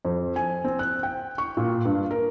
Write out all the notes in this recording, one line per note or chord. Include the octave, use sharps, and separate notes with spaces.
F2
G#5
C4
F#6
G5
C#6
A#2
G2
A#4